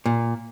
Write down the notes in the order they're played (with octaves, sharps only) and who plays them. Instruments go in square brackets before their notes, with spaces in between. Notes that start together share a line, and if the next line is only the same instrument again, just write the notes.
[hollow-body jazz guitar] A#2